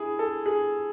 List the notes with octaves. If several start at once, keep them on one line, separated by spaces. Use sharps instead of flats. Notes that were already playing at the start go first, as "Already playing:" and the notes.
Already playing: E4 G#4
A4
G#4